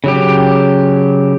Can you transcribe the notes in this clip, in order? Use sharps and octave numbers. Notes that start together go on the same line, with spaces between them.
C#3 F#3 G4